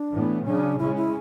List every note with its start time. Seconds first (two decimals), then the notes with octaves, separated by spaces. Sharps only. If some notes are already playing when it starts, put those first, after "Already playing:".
Already playing: D4
0.11 A2 E3 B3
0.46 C#3 F#3 C#4 D4
0.79 C#3 G#3 C#4 E4
0.96 E4